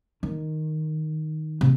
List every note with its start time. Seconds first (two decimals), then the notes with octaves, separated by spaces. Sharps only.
0.23 D#3
1.61 C3